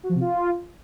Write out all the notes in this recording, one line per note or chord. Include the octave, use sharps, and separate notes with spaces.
F#4
F3
C3
F4